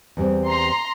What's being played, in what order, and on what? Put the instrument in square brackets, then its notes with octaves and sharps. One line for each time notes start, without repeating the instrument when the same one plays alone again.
[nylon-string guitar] E2 G3 C4
[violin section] A#5 C6